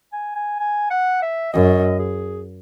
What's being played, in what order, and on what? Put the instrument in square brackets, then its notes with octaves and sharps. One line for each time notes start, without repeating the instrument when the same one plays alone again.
[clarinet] G#5
G#5
G#5
F#5
E5
[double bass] F#2 [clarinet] D#5
[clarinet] G#4